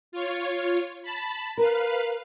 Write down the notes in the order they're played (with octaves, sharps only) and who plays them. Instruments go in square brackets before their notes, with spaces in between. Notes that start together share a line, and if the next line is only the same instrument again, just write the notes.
[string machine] F4 C#5
A5 B5
[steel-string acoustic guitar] A#4 [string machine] B4 F5